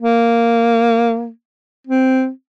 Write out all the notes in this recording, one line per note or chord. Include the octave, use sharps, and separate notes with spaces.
A#3
C4